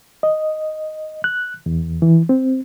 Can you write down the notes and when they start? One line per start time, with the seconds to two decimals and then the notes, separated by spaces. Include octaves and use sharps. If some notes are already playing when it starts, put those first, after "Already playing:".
0.23 D#5
1.24 F#6
1.66 E2
2.02 E3
2.29 C4